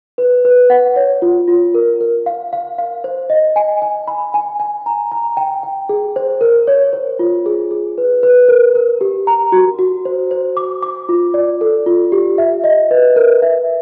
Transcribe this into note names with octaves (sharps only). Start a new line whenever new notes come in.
B4
B4
F#5
C#5
F4
F4
A#4
A#4
F5
F5
F5
C5
D#5
G#5
G#5
B5
G#5
G#5
A#5
A#5
G5
G5
G#4
C5
A#4
C#5
C5
F4
G#4
G#4
B4
B4
A#4
A#4
G4
A#5
F#4
F#4
C5
C5
D6
D6
F4
D5
A4
F4
G4
E5
D#5
B4
A#4
E5